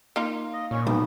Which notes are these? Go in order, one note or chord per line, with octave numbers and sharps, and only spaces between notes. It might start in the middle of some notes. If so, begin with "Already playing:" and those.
A#3 D#4 F4
D#5
A#2 C#4
B1 B3